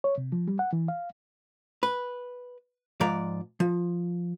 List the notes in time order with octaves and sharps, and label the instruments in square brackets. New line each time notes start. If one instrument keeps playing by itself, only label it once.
[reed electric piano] C#5
C3
F3
G3
F#5
E3
F5
[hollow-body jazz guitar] B4
G#2 F3 D5 A#5
F3